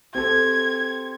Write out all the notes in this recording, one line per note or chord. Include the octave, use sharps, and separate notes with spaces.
C4 G4 A4 G#6